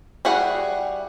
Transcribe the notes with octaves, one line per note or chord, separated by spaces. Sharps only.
G3 E4 F#4 G#4 F#5